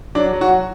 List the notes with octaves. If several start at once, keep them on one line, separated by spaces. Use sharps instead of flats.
F#3 D4
F#3
F#4